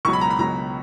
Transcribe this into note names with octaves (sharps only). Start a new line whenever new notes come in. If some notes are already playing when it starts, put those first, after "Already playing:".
C#2 B2 F#3 C#6
B5
A#5
B5
C#2 B2 F#3 A#5